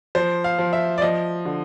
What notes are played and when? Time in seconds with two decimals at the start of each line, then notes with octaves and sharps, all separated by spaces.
0.15 F3 C5
0.44 F5
0.59 F3
0.73 E5
0.98 D5
1.02 F3 D#5
1.46 D3